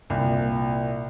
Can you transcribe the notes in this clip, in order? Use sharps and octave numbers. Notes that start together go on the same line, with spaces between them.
C2 A#2